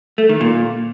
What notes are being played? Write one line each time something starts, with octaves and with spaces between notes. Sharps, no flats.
A3
D#3
A#2